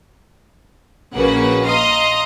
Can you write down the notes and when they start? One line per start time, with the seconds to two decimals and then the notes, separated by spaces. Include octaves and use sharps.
1.16 A#1 C#3 A#3 F#4 B4 F#5
1.66 D#5 F5 A#5 C6 D#6